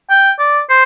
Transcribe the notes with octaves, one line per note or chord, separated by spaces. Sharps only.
G5
D5
C5